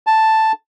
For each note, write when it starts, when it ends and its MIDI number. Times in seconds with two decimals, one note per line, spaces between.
0.07 0.52 81